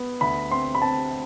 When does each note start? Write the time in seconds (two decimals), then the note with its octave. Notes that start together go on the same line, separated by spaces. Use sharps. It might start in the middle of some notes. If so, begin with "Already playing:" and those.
Already playing: B3
0.21 D2 B5
0.51 C4 C6
0.75 B5
0.81 C4 A5